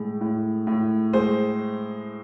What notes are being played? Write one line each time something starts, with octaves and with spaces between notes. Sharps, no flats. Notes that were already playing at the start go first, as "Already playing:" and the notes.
Already playing: A2 G#3
A2
A2
G#3 C5